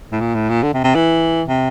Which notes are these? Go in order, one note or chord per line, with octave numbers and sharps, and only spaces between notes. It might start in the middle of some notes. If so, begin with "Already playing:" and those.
A2
A#2
A2
A#2
D3
C3
C3
E3
C3